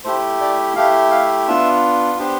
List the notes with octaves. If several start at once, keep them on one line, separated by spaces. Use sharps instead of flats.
A3 E4 G4 C5
D5
A3 E4 G4 F5
F5
B3 D4 F4 E5
B3 D4 G4 C5